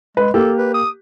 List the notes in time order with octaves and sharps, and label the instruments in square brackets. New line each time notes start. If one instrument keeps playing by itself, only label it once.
[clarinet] G#3 [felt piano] B4
[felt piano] A#3 G4 [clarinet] A4
[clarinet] B4
D#6